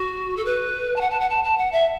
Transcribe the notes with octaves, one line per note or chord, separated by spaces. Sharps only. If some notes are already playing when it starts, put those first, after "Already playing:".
Already playing: F#4
A4
B4
A5
F#5
A5
F#5
A5
A5
F#5
E5